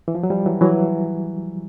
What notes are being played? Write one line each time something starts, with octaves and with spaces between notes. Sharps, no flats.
E3
F3
F#3
F3 G3
E3 F#3
E3 F#3